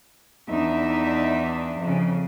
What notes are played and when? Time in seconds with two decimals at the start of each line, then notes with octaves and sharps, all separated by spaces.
0.50 E2 D4 D#4 E5
1.78 F2 C#3